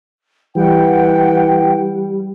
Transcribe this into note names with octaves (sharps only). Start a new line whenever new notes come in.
E3 G3 F#5 G5